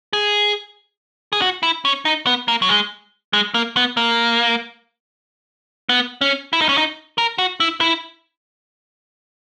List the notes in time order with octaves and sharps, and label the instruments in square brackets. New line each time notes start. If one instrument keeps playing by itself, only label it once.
[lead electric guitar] G#4
G#4
F#4
E4
C#4
D#4
B3
A#3
F#3
G#3
G#3
A#3
B3
A#3
B3
C#4
E4
D#4
C#4
D#4
A#4
F#4
E4
E4